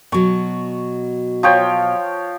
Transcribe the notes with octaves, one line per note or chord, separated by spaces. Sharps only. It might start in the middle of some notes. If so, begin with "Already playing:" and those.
B2 F#3 C#6
F3 C#5 G5